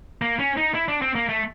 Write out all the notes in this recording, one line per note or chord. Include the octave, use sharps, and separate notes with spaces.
A#3
C#4
D#4
E4
D4
C4
A#3
A3